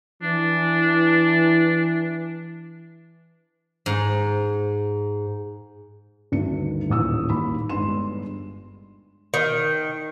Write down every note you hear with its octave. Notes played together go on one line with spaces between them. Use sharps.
E3 D4
G#2
D2 G2 D#3 C#7
D#1 A1 D#6 E6
D#2 B5
G1 G3 G#3 C6 E7
D#3